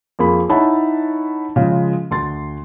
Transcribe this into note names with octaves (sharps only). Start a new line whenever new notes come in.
F2 A#3 G#4 B5
D#4 E4 C#5 F#5 A5 B5
C#3 F3 G#3
D2 C6 A6